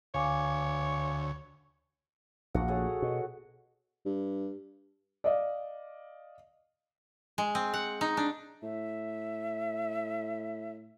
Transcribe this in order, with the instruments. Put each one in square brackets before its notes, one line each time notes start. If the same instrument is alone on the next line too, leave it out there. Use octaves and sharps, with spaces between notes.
[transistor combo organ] D2 [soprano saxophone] C#5 [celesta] F5 G#5 D6
[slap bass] A#1 [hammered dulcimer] F#4 F#5
[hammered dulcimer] G#4 A4 C#5
[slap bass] B2
[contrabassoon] G2
[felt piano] D5 D#5 F5
[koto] G#3
C4
F#5
D#4
D4
[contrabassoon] A2 [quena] E5